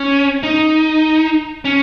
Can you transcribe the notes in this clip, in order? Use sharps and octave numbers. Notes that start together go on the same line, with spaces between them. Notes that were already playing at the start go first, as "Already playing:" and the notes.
Already playing: C#4
D#4
C#4